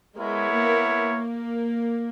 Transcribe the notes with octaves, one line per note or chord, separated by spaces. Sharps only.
G#3 B3 E4 A#4 C#5
A#3
A#3